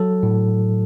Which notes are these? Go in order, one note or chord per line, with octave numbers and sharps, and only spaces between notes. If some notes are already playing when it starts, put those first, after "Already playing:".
Already playing: F#3 A4
A2